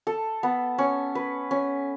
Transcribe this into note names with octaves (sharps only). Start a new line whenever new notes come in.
A4
B3
C#4
B4
C#4